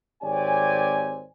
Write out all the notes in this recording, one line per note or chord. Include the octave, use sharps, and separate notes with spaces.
G#1 C4 G4 C#5 D5 G#5